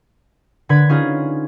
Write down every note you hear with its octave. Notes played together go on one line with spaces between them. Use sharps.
D3 B4 B5 G#6
C#4 D#4 F4 G#4